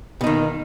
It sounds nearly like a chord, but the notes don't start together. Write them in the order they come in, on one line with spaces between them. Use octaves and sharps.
B2 D#4 D#3